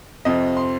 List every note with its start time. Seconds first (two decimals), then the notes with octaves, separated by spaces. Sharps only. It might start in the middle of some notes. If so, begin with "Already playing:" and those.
0.25 F2 C3 F3 C4 D#5
0.57 C6